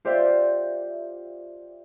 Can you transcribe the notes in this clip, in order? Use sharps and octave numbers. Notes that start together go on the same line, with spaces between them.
F4 G4 C5 D5 E5 F5